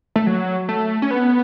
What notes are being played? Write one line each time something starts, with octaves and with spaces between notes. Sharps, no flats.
A3
F#3
A3
C#4
B3